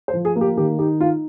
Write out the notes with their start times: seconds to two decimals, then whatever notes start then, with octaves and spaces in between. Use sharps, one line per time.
0.08 C5
0.14 F3
0.25 G#4
0.36 A#3
0.41 G4
0.57 D#3 G4
0.79 D#4 G4
1.00 D#4 F4